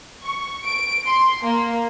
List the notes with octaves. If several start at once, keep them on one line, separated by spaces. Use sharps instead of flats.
C#6
D7
C6
A#3